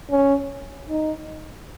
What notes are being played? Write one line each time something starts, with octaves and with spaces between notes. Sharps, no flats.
C#4
D#4